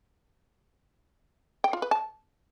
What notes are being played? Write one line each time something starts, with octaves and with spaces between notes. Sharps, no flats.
G5
F4
B4
A5